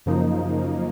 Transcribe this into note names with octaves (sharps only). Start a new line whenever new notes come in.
F#2 C#3 F3 A#3 D#4